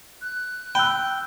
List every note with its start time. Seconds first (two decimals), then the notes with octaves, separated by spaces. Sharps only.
0.21 F#6
0.75 G5 B5 E6